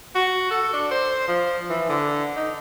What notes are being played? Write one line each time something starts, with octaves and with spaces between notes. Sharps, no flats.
F#4
A4
D4
C5
F3
E3
D3
D#4